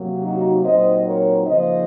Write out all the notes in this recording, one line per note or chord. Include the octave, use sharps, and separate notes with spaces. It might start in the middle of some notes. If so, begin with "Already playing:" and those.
Already playing: C3 F#3 A#3
D#4 F#4
A#2 F#3 C4 D#4 C5 D#5
A#4 C#5
C#3 F3 A#3 D#4 C5 D#5